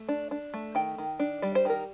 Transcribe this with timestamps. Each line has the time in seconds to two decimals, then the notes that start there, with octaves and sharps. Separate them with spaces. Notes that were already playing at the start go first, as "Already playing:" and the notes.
Already playing: A3
0.09 D4
0.31 D4
0.54 A3
0.75 D#3 G5
0.98 D#3
1.19 D4
1.42 G3 D5
1.55 C5
1.65 D#3 A#4